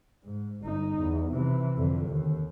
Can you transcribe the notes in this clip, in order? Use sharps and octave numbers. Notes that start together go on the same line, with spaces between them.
G#2
G1 D#4
E2
C3 E3
F2 D3
D#2